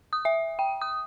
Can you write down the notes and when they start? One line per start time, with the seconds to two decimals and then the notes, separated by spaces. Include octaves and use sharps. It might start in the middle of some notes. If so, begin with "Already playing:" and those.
0.13 D#6
0.25 E5
0.59 G5
0.82 D#6